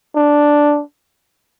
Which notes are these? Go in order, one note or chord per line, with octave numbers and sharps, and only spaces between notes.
D4